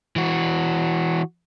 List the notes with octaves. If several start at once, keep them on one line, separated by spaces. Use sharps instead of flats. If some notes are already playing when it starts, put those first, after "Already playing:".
E3 F#4